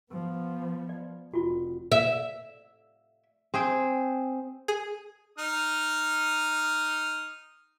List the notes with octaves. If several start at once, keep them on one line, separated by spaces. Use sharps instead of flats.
F3 B3
D5
F1 F4 F#4
E5
C4 G#4 G5
G#4
D#4 D#6 F6